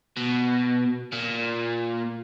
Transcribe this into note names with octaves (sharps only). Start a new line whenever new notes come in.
B2
A#2